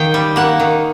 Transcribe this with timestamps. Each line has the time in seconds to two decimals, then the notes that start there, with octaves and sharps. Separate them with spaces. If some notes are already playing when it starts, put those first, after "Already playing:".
Already playing: D#3 A#3 G5
0.14 G3
0.36 A#3 F#5
0.60 D#3